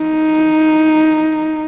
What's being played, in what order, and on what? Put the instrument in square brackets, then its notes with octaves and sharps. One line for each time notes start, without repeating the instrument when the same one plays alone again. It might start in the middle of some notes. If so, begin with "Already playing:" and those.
Already playing: [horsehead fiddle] D#4